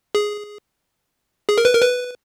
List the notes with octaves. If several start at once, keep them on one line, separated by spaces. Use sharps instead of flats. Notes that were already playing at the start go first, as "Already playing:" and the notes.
G#4
G#4
A#4
B4
A#4
B4